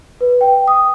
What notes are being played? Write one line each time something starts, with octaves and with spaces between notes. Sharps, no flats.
B4
G5
D#6